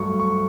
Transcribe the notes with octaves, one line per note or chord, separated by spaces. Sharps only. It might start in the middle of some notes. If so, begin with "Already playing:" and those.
Already playing: G2 F#3 A3 C#6
C#6